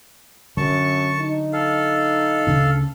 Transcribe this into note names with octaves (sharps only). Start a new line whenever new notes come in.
F#2 D3 F#3 A5 C#6
D#4
A4 F5
D2 C#3 D4